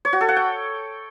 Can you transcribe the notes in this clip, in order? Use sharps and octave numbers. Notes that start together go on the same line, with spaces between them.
C#5
F#4
A4
F#5
G5